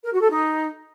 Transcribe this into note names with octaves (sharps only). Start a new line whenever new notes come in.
A#4
F#4
A4
D#4